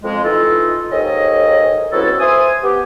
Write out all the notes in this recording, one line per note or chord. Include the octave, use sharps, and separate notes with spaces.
F2 G#3
E3 D#4 F4 A4
D#2 G#2 C#4 A4 D#5
C#2 F#3 B3 C4 E4 A4
C5 E5 G#5 D#6
B3 G4